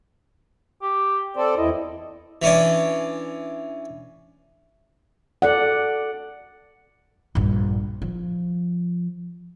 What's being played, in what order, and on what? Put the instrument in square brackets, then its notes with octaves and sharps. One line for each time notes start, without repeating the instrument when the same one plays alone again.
[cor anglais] G4
[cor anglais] C4 [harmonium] A4 D5
[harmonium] E2 E4 [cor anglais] D#5
[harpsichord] E3 C#4 D4
[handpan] A4 D5 F#5
[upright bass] A#1 G2
F3